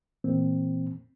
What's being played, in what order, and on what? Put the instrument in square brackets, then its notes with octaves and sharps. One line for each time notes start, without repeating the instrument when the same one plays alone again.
[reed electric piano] A#2 E3 A#3 C4